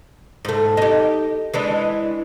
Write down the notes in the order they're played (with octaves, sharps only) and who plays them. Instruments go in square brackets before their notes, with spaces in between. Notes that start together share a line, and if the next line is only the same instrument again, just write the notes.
[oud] G#2 A3
D#4 G4
E3 G#3 D4